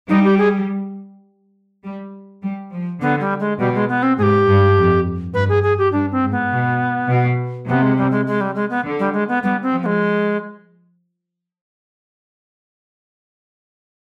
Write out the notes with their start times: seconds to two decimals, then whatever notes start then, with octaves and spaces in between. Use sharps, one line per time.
0.09 G3 D#4
0.24 G4
0.38 G#4
1.84 G3
2.43 G3
2.72 F3
3.01 D3 B3
3.20 G3
3.40 G#3
3.59 B2 G3
3.75 G#3
3.89 B3
4.03 C4
4.17 G#2 G#4
4.23 G4
4.47 G2
4.76 F2
5.34 G2 B4
5.49 G#4
5.63 G#4
5.78 G4
5.92 G2 D4
6.12 C4
6.22 G#2
6.31 B3
6.52 B2
7.09 B2
7.68 C3 B3
7.82 G#3
7.97 G3
8.11 G#3
8.27 G#3
8.41 G3
8.55 G#3
8.70 B3
8.85 D3
8.99 G3
9.13 G#3
9.28 B3
9.43 G3 B3
9.62 C4
9.72 F3
9.83 B3
9.86 G#3